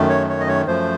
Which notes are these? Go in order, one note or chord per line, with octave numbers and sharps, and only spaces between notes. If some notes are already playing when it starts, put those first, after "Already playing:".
Already playing: F#2 D#3 A3
C#5
C#5
D#5
C#5
F#2 F3 A3 C5